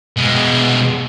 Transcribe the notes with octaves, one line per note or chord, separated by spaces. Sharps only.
B2 G#3